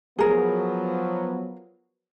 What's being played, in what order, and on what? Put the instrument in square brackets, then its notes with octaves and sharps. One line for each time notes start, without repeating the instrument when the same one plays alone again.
[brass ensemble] F3 F#3 B3 [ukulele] G#4 A#4